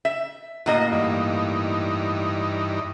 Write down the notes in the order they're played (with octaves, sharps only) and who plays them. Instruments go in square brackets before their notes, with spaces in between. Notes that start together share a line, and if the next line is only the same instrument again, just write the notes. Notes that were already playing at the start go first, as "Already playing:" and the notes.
[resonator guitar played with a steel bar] E5
[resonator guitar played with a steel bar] A2 A#3 D#5 [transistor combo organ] F#4
[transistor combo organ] G2 E3 D#4